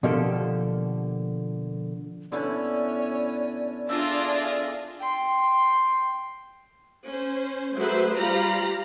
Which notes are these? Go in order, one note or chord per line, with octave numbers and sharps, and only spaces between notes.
B2 D3 F3 A#3 G4 A4
B2 D3 C#4 E4 D5
D4 F4 G#4 E5 A#6
G5 C6
C#4 C5
F#3 A3 G#4 B4 C5 E5
G3 F4 G4 F5 A#5 B5